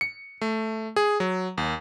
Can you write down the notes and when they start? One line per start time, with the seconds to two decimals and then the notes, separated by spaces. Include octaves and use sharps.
0.01 C#7
0.41 A3
0.96 G#4
1.20 F#3
1.58 D#2